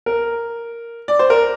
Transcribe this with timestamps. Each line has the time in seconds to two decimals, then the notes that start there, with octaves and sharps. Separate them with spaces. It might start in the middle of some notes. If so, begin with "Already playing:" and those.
0.06 A#4
1.08 D5
1.19 C5
1.30 A#4